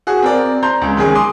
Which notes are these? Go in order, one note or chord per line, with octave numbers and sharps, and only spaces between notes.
F#4 G#4
C4 A#4 D5
A#5 C6 G6
C#2
D#3 G#3 C#4 G#4
C6 D6 D#6